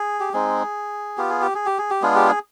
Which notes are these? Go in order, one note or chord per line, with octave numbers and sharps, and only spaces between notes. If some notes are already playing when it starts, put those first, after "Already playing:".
Already playing: G#4
G4
G#3 C4 D#4 G#4
B3 F4 G4
G#4
G4
G#4
G4
G#4
G4
G#3 B3 D4 F4 G#4
G4
G#4